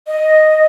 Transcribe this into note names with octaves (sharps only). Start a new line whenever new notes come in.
D#5